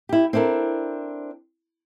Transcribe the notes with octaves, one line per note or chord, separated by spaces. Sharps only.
E4 G4
C4 D4 E4 A4 A#4